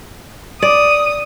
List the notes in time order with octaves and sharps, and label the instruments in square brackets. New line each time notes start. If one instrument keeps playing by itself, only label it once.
[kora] D5 [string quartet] D#6